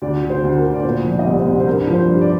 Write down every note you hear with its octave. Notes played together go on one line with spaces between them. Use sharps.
D2 D5
D2
C5
D2
A#4
D2
D5
A#2 C5
F3
D5
D#5
C2 D5
C5
C2
C5
G2 A#4
F3
C5
G2
D5